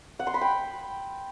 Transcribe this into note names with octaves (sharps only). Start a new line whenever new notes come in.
F#5
C6
B5
G5